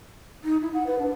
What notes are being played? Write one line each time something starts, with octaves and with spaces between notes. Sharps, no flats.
D#4
E4
F#5
B4
D4